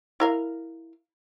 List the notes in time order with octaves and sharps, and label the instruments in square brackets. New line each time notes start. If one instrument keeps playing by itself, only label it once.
[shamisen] E4 A#4 F5